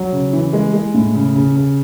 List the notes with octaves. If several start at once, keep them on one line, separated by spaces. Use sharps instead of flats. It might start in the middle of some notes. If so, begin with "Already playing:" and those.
Already playing: F#3
C#3
E3
G#3
G#3
A2
C#3
C#3
C#3